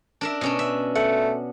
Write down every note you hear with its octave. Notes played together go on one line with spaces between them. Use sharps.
D4 A#4 E5
B2 C#4 D4
E5
A3 F#5